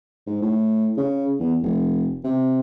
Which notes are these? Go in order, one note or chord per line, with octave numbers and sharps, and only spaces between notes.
G#2
A2
C#3
E2
F1
C3